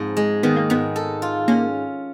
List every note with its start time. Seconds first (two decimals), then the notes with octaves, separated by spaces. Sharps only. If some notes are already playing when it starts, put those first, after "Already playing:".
Already playing: G#2 F3 C4
0.17 G#3
0.43 D#3 B3
0.56 A#3
0.70 G#2 B3
0.96 A4
1.22 F4
1.48 A#3 C#4